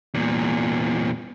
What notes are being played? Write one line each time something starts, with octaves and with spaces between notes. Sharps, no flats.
E2 A#2